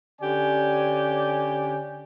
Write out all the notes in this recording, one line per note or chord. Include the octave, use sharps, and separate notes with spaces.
D3 C#4 G4 D5 G#5